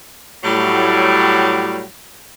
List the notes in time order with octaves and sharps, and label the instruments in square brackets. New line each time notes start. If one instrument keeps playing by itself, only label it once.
[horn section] A2 F#3 G3